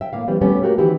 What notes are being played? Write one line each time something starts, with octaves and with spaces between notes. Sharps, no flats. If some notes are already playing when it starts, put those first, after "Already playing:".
E5 G5
A2 A#3 F5
E3 G3 C4
G3 A3 B3 C#4 G4 A4
A3 A#3 F#4 G4 A#4
D#3 E3 C4 E4 F#4 G4